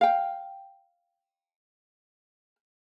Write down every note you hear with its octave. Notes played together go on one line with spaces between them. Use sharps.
F5 G5